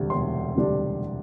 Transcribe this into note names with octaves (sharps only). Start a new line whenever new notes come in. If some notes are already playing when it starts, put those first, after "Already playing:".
Already playing: E1 D2 C3 G3 D4
E1 C6
D2 C3 G3 D4